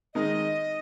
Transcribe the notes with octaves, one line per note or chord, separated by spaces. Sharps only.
D#3 G#3 D#4 A#4 D#5